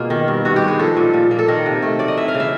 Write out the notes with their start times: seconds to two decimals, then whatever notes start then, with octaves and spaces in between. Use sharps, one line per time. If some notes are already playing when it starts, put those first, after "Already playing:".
Already playing: B2 A#3 F4 G#4
0.10 D#3
0.28 G2
0.45 G2 F#4
0.56 G4
0.62 G#3
0.68 G#4
0.79 F3 A4
0.97 A#2
1.14 A#2
1.31 A#3
1.39 A4
1.48 D#3 A#4
1.66 C3
1.82 A3
1.99 F#3 D5
2.08 D#5
2.17 E3 E5
2.28 F5
2.34 C#3
2.40 E5